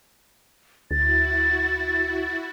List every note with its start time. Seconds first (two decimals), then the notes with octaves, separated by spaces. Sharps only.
0.91 D2 E4 F#4 A6